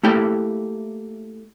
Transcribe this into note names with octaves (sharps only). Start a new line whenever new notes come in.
A3 A#3 E4 G4 G5